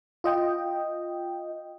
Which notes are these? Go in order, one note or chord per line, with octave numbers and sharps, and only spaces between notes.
F4 D#5 G5